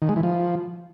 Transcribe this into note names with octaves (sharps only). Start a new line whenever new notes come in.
D#3
G#3
E3
F3